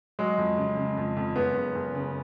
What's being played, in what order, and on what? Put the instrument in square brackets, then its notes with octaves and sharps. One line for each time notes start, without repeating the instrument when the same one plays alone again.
[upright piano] F#3 [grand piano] G#3
[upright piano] F2
C#3
C#3
F2
F2
[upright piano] F#1 [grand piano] B3
[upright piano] F#1
F#1
C#3